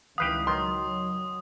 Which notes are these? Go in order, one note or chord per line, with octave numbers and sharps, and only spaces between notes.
C#2 D#3 E3 G4 B4 F5 D#6
D#3 F#3 C6